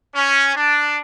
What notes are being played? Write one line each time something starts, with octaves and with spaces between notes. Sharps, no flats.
C#4
D4